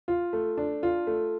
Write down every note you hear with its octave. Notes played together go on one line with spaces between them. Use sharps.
F4
A3
D4
F4
A3